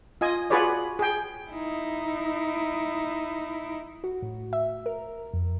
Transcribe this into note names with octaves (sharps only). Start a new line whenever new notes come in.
F4 D#5 G#5
F4 F#4 G#4 B4 C#5 D5
G#4 G5
D#4 E4
F#4
A2
E5
A#4
F2